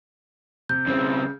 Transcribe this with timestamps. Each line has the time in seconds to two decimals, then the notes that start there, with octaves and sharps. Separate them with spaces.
0.69 C3 G6
0.86 C#2 C#3 C4